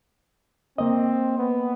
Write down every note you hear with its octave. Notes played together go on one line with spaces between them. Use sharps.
A#3 C4 D#5
B3